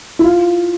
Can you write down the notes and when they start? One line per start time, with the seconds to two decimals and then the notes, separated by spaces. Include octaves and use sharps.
0.19 E4
0.24 F4